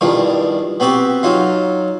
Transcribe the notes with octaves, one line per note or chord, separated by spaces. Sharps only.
E2 G2 D#3 F3
B3 C4 F#4 G4
F#3 D#4 F4